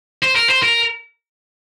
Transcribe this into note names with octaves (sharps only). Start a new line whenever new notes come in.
C5
A#4
C5
A#4